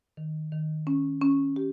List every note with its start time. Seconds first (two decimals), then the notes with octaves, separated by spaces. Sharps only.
0.17 D#3
0.52 D#3
0.87 C#4
1.21 C#4
1.56 G4